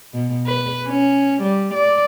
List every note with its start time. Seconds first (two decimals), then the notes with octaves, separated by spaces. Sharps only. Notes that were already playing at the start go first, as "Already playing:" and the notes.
0.13 B2
0.47 B4
0.88 C#4
1.42 G3
1.74 D5